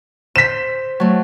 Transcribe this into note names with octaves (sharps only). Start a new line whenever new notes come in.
C5 B6 E7
F#3 A3